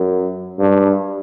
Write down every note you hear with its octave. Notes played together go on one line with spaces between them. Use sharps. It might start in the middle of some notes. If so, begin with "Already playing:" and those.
Already playing: F#2
G2